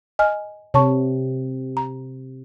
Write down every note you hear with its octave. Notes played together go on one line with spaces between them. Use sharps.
D#5 G#5 F6
C3 C#5 A5 C#6
A#5